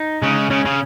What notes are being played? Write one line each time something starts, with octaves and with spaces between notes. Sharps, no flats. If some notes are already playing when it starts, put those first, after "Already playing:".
Already playing: D#4
C#3 G#3
C#3 C#4
C#3